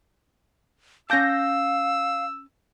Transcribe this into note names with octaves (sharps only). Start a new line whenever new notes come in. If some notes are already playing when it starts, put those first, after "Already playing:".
C#4 F5 A5 D6 E6 G6 A#6